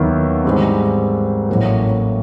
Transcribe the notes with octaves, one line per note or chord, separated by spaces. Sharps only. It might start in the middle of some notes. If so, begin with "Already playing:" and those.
Already playing: D#2 D#3 F#3 B3 E4
G#2 E3 G3 C4
A1 A2 F#3 A#3